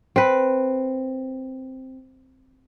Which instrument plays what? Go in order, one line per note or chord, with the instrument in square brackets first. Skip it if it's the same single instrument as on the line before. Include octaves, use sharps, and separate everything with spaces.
[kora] C4 B4